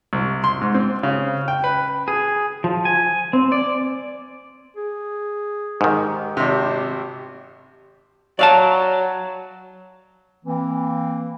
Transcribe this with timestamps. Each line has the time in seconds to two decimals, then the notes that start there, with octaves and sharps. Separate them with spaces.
0.13 C2
0.44 C6
0.61 G#2
0.75 C4
1.03 C#3
1.48 G5
1.64 B4
2.08 G#4
2.64 F3
2.85 G#5
3.33 C4
3.52 D5
4.77 G#4
5.81 G#2 D#3 G4
6.37 G#1 C3
8.39 F#3 D5 F5 A5
10.45 E3 A#3 C4